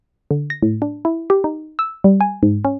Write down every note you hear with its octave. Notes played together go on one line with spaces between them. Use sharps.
D3
A#6
A2
D4
E4
G4
D#4
E6
G3
G#5
G#2
C#4